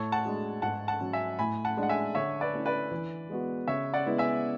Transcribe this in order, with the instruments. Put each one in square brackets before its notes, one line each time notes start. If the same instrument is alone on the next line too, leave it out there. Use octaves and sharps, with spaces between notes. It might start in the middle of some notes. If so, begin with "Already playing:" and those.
Already playing: [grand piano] A2 [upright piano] A4 C#5
[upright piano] F#5 A5
[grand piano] G#3 D4 F#4
[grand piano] G#2 [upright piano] F#5 A5
[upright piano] F#5 A5
[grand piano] F#3 C#4
[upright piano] E5 G#5
[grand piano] A2 [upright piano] G#5 B5
[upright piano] F#5 A5
[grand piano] G#3 D4
[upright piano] F#5
E5 G#5
[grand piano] D3 [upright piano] C#5 E5
[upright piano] B4 D5
[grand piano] A3 C#4 E4
[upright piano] B4 D5
[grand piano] E3
G#3 B3 F#4
[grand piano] C#3 [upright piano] C#5 E5
[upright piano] D5 F#5
[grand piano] G#3 B3 E4
[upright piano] E5 G#5